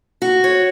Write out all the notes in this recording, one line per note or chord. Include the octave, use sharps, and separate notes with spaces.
F#4
C#5